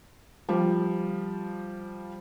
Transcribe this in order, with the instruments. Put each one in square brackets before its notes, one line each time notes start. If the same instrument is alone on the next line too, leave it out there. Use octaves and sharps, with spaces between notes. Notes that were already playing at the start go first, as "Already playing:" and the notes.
[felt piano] F3 G3